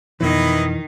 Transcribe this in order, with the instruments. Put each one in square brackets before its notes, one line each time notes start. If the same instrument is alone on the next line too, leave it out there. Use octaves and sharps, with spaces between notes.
[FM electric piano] F2 B2 [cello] D#3 [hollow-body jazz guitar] E3 [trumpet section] E4 B4 D#5